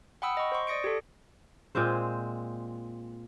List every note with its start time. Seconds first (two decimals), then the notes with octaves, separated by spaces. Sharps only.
0.22 F#5 G5 B5 D#6 E6
0.37 D#5 C#6
0.52 C5 C6 C#6
0.67 D5 D#6 A#6 C#7 D7
0.84 G4 A4
1.75 A#2 G#3 C4 C5